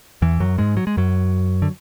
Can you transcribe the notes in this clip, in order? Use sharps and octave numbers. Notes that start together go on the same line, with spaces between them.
E2 E3
F#2 F#3
G#2 G#3
F#3
G#3
F#2 F#3
D3